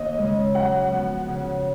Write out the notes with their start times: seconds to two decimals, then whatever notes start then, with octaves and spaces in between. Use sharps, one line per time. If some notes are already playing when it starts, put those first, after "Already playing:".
Already playing: D#2 D#5
0.18 C#3 G#3
0.55 F#2 F#5
0.91 F3 B3 F#4
1.28 C#3